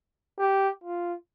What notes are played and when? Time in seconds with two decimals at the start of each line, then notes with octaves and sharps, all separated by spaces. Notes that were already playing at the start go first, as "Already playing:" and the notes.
0.39 G4
0.84 F4